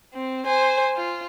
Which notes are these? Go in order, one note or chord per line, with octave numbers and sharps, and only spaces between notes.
C4
C5 G#5
F4